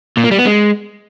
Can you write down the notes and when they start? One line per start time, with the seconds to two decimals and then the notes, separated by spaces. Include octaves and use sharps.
0.17 A#2
0.24 A#3
0.31 G3
0.39 B3
0.46 G#3